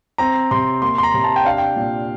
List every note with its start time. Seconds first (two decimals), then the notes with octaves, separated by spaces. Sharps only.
0.18 C4 A#5
0.51 C3 C6
0.82 A#3 C6
0.98 C6
1.03 A#5
1.14 C3
1.24 A5
1.36 G5
1.45 D4 F5
1.58 G5
1.76 A#2